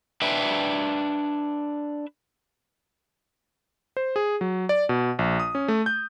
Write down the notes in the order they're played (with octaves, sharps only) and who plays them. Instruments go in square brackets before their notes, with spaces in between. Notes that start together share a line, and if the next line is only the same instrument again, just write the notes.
[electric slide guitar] D4 B4 E5 G5
[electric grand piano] C5
G#4
F#3
D5
B2
A#1
D#6
C#4
A3
G6